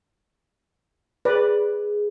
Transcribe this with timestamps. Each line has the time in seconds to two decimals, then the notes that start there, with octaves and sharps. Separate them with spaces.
1.25 G#4 B4 D5